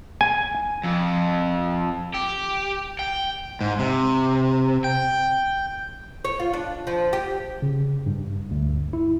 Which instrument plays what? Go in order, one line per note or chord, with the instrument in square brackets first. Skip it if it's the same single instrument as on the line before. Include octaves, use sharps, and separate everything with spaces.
[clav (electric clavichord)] G#5
[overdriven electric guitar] F2
G4
G5
G#2
C3
G5
[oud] C#5
F4
D4
F3
G4
[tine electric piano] C#3
G2
D2
E4